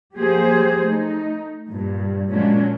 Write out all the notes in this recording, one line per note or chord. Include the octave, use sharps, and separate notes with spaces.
F3 F#3 A#3 G4 G#4 C5
A3 D#4
G2 A#2
A#2 F#3 G#3 C#4 D4